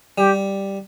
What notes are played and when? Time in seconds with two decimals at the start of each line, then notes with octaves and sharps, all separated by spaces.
0.18 G3 G4